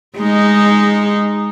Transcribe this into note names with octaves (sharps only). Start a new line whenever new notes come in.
G#3 D#4